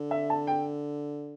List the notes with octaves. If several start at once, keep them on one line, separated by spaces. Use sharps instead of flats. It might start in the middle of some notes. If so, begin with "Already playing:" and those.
Already playing: D3
E5
A5
G5